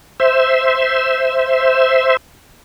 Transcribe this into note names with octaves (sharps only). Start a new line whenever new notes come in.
C5 E5